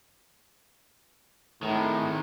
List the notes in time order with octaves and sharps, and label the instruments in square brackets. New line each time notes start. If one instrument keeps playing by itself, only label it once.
[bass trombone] A2 [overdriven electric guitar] D#3 G#3